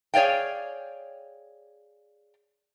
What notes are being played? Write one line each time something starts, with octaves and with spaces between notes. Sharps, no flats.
G#4 C#5 D5 F5 G5